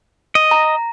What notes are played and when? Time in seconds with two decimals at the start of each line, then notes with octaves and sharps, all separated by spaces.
0.35 D#5
0.51 A#5